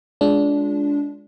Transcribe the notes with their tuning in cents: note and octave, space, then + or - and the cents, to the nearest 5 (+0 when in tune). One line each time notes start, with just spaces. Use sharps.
G#3 +0 D4 -20 F4 +0